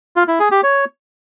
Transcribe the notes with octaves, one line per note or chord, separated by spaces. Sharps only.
F4
E4
G#4
G4
C#5